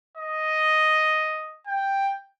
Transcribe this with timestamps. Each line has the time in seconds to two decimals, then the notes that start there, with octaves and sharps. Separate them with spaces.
0.17 D#5
1.67 G5